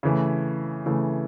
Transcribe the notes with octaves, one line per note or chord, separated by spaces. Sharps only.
C#3 E3 A3
C#3 E3 A3